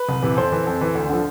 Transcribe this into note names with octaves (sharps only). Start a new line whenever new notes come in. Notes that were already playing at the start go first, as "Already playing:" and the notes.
Already playing: B4
C2
C3 E3
F2 C5
E3
F2
E3
D2
D3 F3